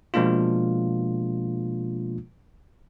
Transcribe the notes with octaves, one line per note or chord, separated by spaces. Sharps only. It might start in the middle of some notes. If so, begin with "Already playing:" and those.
B2 F3 G#3 A#3 D4 F4